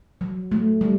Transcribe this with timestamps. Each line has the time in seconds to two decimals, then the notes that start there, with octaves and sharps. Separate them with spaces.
0.21 F#3
0.52 A3
0.81 G3